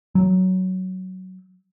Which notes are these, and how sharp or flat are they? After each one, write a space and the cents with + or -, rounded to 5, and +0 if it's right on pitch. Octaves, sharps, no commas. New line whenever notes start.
F#3 +10